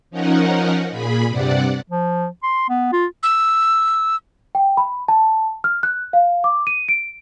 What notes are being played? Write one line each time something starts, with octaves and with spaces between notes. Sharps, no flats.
F3 C#4 D#4 A#4 F#5
A#2 G#4 B5
G2 C3 D5 F#5
F3
C6
B3
F4
E6
G5
B5
A5
F6
F#6
F5
D6
D#7
D7